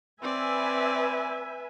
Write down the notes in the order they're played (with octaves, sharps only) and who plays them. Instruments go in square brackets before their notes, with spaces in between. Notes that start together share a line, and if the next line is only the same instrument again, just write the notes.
[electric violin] C4 D5 [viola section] B4 E5 G#5